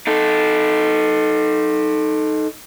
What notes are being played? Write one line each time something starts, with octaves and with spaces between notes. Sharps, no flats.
D#4 A4